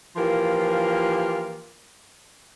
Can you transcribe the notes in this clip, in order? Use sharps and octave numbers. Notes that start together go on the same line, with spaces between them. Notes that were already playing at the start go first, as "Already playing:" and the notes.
E3 F3 A#3 F4 G4 A#4